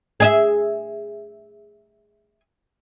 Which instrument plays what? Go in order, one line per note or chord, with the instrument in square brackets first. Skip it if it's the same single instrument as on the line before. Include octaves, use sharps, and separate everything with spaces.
[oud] G#4 D#5 E5